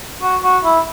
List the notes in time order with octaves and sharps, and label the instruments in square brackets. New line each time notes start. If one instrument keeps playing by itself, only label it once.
[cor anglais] F#4
F#4
E4